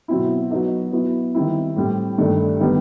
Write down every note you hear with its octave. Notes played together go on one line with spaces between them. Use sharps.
B2 F#3 C4 E4
F#3 B3 D#4
F#3 B3 E4
D#3 G3 C4 E4
A2 G3 C4
G2 D#3 A3
D#3 G3 B3